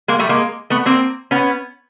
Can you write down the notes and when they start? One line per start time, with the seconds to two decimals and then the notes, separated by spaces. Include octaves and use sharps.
0.08 G#3 A#3
0.19 G3 A3
0.29 G#3 A#3
0.70 A3 B3
0.86 A#3 C4
1.31 B3 C#4